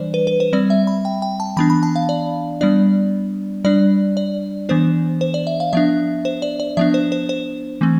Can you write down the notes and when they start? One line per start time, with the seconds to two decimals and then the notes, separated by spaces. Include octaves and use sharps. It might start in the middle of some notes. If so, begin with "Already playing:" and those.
Already playing: E3 G3 D4 C5 D5
0.14 B4
0.27 B4
0.40 C5
0.53 G3 C4 D5
0.70 E5
0.87 B5
1.05 G5
1.22 G5
1.40 A5
1.57 E3 B3 D4 B5
1.70 B5
1.83 A5
1.96 F5
2.09 D5
2.61 G3 B3 D4 D5
3.64 G3 D4 D5
4.17 D5
4.69 E3 B3 D4 C5
5.21 C5
5.34 D5
5.47 E5
5.60 F5
5.73 F3 B3 D4 E5
6.25 C5
6.42 D5
6.60 D5
6.77 F3 B3 D4 E5
6.94 C5
7.12 C5
7.29 C5
7.81 E3 A3 C4